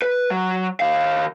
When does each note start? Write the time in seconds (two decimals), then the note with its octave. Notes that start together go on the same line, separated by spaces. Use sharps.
0.02 B4
0.31 F#3
0.80 D#3 F5